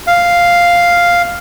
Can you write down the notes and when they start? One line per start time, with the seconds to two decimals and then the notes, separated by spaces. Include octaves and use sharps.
0.07 F5